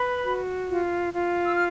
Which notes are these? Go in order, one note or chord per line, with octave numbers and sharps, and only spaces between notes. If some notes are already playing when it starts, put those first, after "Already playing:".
Already playing: B4 B5
F#4
F4
F4
E6
F6